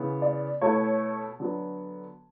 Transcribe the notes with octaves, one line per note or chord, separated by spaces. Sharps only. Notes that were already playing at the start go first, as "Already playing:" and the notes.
Already playing: C#3 E3 B3
D5
B2 A3 E4 C#5
D3 F#3 B3